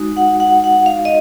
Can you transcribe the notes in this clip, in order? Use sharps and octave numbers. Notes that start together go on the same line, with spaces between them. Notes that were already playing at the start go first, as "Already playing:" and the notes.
Already playing: G#3 D#4 F#4
F#5
F#5
F#5
F5
D#5